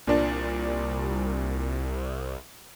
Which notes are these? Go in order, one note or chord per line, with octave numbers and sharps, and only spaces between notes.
C2 A#2 D4